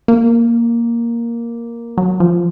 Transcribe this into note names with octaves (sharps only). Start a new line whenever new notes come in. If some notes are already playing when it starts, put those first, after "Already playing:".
A#3
F#3
F3